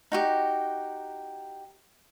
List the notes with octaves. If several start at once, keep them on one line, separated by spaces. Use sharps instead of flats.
D#4 F#4 G4